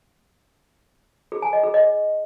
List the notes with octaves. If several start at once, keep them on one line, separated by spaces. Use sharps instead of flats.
G#4
G#5
D#5
G#4
D#5